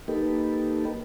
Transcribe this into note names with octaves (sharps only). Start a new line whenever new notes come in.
A#3 D#4 G4 A4 B4